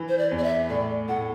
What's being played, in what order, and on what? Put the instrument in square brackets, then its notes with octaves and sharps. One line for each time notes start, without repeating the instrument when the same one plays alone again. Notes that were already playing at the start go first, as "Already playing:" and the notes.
Already playing: [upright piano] E3
[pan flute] C5
D5
[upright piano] E2
[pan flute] D5
E5
[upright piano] A2 [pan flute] D5
[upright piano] A2 [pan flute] F#5